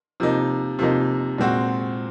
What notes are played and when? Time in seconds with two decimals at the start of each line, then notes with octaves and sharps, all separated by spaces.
0.20 C3 F3 A#3 D#4
0.79 C3 F3 A#3 D#4
1.38 A#2 G#3 C4 F#4